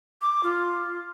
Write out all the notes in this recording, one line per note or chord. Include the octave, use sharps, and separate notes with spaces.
D6
F4